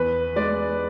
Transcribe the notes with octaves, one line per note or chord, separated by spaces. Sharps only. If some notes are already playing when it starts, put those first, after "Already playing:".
Already playing: E2 B4
G#3 D5